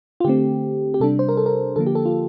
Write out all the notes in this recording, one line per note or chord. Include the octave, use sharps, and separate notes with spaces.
F4
D3 A3 C4 G4
G4
C3 G3 D4 A4
C5
A#4
A4
A#4
D3 F3 A#3 A4
G4
A4
F4